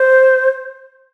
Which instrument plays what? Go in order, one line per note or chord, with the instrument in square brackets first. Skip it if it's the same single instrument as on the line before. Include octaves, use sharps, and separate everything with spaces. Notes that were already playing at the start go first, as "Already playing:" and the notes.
Already playing: [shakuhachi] C5